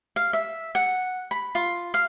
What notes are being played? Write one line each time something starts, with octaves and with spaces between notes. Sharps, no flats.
F5
E5
F#5
B5
F4
F5